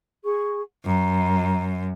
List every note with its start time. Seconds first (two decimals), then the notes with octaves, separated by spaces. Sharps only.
0.23 G#4 C#6
0.86 F#2 A#5